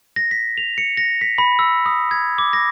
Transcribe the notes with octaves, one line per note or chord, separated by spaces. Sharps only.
A#6
B6
F7
C#7
A#6
B6
B5
E6
D#6
G#6
D6
A#6